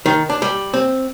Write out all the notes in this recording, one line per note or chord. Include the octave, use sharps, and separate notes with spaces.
D#3
D4
G3
C4